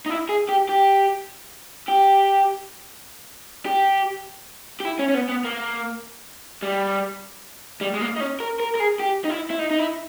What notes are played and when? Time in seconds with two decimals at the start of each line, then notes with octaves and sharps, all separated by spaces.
0.06 D#4
0.10 E4
0.29 G#4
0.49 G4
0.69 G4
1.88 G4
3.66 G4
4.80 G4
4.85 E4
4.99 C#4
5.09 C#4
5.14 B3
5.29 B3
5.44 A#3
6.62 G3
7.81 G3
7.94 G#3
8.01 A#3
8.16 D#4
8.20 C#4
8.40 A#4
8.60 A#4
8.76 A#4
8.80 G#4
9.00 G4
9.24 D#4
9.30 E4
9.50 E4
9.59 D#4
9.71 D#4
9.79 E4